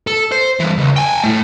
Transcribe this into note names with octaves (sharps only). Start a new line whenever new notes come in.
A4
C5
G2 E3
C#2
G5 G#5
A3 E4